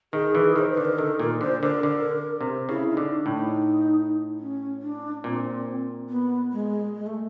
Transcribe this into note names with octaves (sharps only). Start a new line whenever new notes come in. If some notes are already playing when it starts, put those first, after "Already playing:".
D#3 G#4
E3
D#3 C5
B4
D3
A#4
D#3 A4
A#2 A#4
D3 C5
D3 A#4
D3
C3
C#3 E4
D#4
D3
D4
A2
D#4
C#4
D4
A#2 C4
B3
G#3
G#3
A3